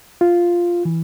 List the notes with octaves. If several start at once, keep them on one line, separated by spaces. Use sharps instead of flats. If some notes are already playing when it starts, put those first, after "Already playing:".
F4
E3